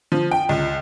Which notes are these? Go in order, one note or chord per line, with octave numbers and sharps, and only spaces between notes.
F3
G5
C#2